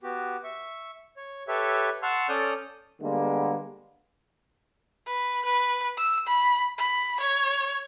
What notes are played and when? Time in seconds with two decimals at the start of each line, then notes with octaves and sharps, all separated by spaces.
0.03 B3 F#4 G4
0.44 E5 C#6
1.17 C#5
1.48 G4 A4 B4 C#5 E5
2.03 F#5 A5 C6 C#6 E6 F6
2.29 C#4 A4 D5 D#6 F6 G6
3.02 D3 G3 G#3 A#3 B3
5.07 B4
5.45 B4
5.97 E6
6.27 B5
6.78 B5
7.20 C#5